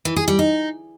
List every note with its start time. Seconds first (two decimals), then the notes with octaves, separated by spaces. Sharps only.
0.05 E3
0.16 G#4
0.28 G3
0.39 D#4